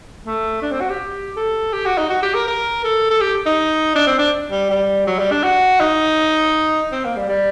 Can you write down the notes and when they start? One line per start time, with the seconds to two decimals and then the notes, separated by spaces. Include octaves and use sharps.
0.25 A3
0.62 D4
0.71 C4
0.81 F#4
0.89 G4
1.36 A4
1.73 G4
1.85 F#4
1.98 D#4
2.10 F#4
2.23 G4
2.35 A#4
2.47 A#4
2.84 A4
3.11 A4
3.21 G4
3.46 D#4
3.95 D4
4.07 C4
4.19 D4
4.51 G3
4.70 G3
5.07 F#3
5.19 G3
5.31 D4
5.44 F#4
5.80 D#4
6.92 C4
7.05 A#3
7.16 G3
7.29 G3